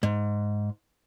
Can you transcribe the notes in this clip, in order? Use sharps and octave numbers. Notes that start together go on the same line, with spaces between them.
G#2